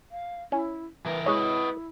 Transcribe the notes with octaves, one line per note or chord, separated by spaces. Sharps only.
F5
C#4 E4
E3 A#4 B4
G#3 E4 B4 C#5 D#5